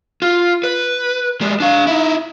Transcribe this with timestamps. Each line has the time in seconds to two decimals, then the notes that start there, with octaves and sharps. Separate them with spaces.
0.22 F4
0.63 B4
1.41 G3 G#3
1.60 D4 F5
1.87 D#4 E4